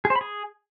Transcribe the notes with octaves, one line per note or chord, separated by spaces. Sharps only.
G#4
C5
B5
G#4